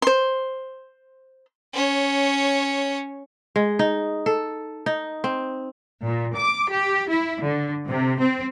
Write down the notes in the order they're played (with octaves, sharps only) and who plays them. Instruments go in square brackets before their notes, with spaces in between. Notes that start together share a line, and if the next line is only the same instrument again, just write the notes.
[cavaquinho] C5 C6
[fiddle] C#4 C#5
[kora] G#3
D#4
A4
D#4
C4
[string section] A#2
D6
G4
E4
D3
C3
C4